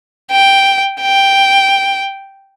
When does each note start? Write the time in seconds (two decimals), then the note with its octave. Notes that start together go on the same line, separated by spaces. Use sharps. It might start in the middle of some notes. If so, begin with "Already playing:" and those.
0.31 G5
1.01 G5